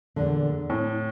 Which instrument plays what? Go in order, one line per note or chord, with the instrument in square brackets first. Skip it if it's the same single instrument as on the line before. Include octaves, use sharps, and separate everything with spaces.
[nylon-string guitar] E2 A#2 D3
[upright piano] A2 [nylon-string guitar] C4